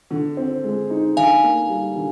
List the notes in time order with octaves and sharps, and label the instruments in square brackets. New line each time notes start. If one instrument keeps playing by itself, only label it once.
[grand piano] D3
C4
G#3
D#4
[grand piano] D3 [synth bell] F5 G#5
[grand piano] A#3
G3
D3